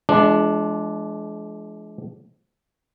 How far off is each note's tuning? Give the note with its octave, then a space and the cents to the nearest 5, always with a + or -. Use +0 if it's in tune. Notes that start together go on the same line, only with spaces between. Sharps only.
F3 -30 G#3 +35 D4 +0